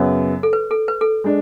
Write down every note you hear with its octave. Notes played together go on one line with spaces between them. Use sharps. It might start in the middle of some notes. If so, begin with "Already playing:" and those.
Already playing: F#2 C#3 F#3 B3 C#5
A4
B4
A4
B4
A4
G#3 D4